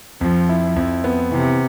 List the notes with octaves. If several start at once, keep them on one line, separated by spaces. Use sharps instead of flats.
F2 F3
E4
F2
B3
C3 E3